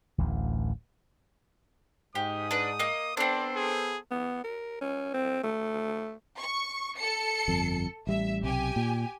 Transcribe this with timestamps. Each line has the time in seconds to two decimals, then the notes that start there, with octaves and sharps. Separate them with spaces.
0.18 D1 A1 D2
2.15 G#2 G4 D#6
2.51 D4 B4
2.79 A#3 D#5
3.17 B3 C4 D4 A4 C5 D5
3.56 G#4
4.11 B3
4.44 A#4
4.81 C#4
5.14 C4
5.43 A3
6.39 C#6
6.98 A4 C#7
7.48 G1 F2
8.07 A1 G3 E5
8.43 B1 C3 G4 G#5
8.76 A#2